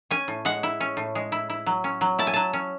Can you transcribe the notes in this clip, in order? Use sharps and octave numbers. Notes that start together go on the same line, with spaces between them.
C#4 G#5
A2
G#3 F#5
E4
C#4
A2
G#3
E4
E4
F#3
C#4
F#3
E4 A5
G#5
F#3 A5
C#4